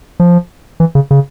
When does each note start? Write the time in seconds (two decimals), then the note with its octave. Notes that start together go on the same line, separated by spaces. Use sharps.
0.20 F3
0.80 E3
0.95 C#3
1.11 C#3